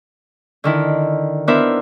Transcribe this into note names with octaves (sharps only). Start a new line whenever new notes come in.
D3 D#3 E4
B3 D4 E4 A#4 C5 E5